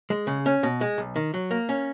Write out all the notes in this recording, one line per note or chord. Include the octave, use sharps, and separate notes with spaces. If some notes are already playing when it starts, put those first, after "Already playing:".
G#3
C#3
C#4
B2
G#3
B1
D#3
F#3
A#3
C#4